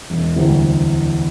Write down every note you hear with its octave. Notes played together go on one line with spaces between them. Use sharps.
E1
D2 C3 E3 G3